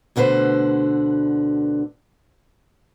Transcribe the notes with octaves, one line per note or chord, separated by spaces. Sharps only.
D2 B2 D3 B4 C5